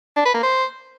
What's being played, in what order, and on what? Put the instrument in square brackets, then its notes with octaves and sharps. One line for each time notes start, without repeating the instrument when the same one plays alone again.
[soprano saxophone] D4
B4
A#3
C5